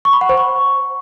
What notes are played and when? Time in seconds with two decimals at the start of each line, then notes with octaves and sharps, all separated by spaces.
0.05 C#6
0.13 B5
0.21 F#5
0.29 C5
0.37 C#6